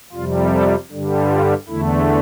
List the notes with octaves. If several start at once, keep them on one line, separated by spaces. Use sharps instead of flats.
F2 C3 G3 F4
A4
G2 D3 G3
F4
E2 D3 A3 E4